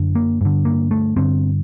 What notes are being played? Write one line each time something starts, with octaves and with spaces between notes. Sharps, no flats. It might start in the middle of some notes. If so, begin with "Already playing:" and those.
Already playing: F#2 D3
A#3
G2 D3
A#3
A3
G2 D3 C4